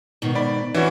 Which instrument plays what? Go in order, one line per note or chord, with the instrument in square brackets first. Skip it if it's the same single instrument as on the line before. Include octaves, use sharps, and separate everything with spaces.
[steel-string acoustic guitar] G#2 B2 D#3
[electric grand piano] D5 B5
[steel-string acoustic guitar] F2 C#4 E4 [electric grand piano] E3 F#4